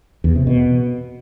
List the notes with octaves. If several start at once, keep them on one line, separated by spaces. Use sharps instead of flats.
E2
C3
B2